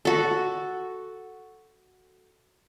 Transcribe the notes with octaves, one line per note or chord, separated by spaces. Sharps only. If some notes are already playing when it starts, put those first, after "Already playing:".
F#4 A4